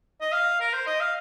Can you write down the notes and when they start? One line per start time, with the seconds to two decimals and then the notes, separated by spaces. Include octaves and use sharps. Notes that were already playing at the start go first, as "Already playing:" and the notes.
0.21 D#5
0.32 F5
0.60 A#4
0.73 C5
0.87 D#5
1.00 F5